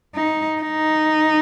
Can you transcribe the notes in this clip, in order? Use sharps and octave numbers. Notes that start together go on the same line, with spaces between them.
D#4
D#4